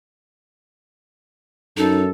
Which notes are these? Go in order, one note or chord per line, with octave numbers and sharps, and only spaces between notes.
F#2 D#4 A4